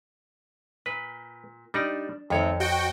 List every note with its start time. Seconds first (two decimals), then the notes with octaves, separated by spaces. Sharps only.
0.86 A#2 B4
1.74 G3 D4 D#4 D5
2.30 F2 D#3 A3 C4 C#5
2.60 F#4 D#5 G5